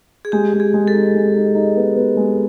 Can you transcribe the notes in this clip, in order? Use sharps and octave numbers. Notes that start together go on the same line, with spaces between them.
G#4
G#3 G4
G#3
G#4
G#3
A4
D#4
G#3
D#4
D#4
B3
B3
G#3